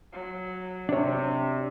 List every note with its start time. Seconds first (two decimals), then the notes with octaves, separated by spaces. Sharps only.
0.13 F#3
0.89 C3 D4 C#5